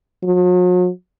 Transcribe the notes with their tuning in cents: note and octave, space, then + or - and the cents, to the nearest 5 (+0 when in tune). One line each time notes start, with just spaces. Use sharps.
F#3 -45